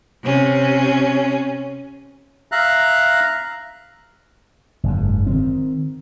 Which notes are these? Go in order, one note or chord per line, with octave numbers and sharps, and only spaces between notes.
C3 C#4
E5 F5 A#5 F#6
F#1 G#2
D#3 C4